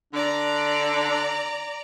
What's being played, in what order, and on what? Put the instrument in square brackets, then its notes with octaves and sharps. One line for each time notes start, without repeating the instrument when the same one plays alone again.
[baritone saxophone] D3 [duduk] D4 [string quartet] D5 A#5